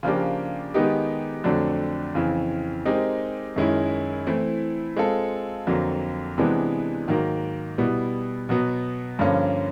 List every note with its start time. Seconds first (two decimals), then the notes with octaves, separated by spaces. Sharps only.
0.03 C#3 F3 A#3 D4 G4
0.74 D#3 G#3 B3 D#4 G4
1.44 F2 D3 F#3 A3 D4
2.15 F2 C#3 E3
2.85 G#3 C4 D#4 G4 A#4
3.56 F#2 D#3 G#3 C#4 E4
4.27 E3 A3 C4 E4
4.96 G#3 C4 F4 A4
5.67 F2 D3 F#3 A#3
6.38 C3 E3 G#3 B3 D4
7.07 G#2 D#3 F#3 A#3
7.78 B2 G3 B3 E4
8.49 B2 F#3 B3
9.19 G2 D3 F3 A#3 C#4